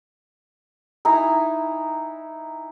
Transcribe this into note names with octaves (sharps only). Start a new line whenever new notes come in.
D#4 E4 G#5 A#5